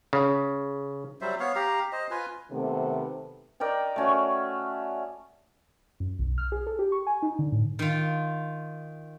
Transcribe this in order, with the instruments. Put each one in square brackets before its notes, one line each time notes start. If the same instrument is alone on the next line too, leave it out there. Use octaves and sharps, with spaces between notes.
[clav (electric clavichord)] C#3
[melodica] F#3 G3 C5 E5
B3 C#5 F5
G4 F5 A#5
C5 D#5
F4 B4 G#5
[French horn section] C3 D#3 A3 B3
[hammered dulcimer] A#4 D5 D#5 G5
A3 C#4 F#4
[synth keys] F#2
B1
F6
G#4
A4
G4
C#6
G#5
D#4
D3
A2
[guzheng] D#3 F4